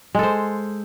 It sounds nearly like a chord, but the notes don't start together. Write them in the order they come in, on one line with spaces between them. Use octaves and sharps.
G#3 A4 C5